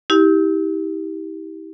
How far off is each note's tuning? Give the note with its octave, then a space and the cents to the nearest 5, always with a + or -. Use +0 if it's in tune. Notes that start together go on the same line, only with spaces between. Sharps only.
E4 -40 G4 +0